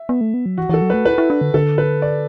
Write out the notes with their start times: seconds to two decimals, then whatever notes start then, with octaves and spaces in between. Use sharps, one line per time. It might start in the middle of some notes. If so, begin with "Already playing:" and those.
Already playing: E5
0.09 B3
0.21 A3
0.34 B3
0.46 F#3
0.58 E3 F#4
0.69 E3 A4
0.82 F#3
0.90 A3 B4
1.05 E4 B4
1.18 E4
1.30 D4
1.41 D3
1.54 D3 A4
1.78 B4
2.02 D5